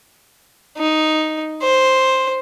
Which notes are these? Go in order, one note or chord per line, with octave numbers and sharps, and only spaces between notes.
D#4
C5